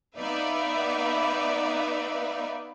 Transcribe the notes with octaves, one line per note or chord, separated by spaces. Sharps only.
B3 D#4 B4 D5 E5 F5